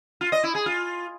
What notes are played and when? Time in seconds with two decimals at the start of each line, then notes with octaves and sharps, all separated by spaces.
0.21 F4
0.32 D#5
0.43 E4
0.55 G#4
0.66 F4